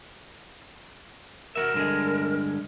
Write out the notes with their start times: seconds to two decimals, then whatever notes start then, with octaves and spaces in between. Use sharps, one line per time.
1.55 F#4 A#4 E5
1.74 G2 D3 G#3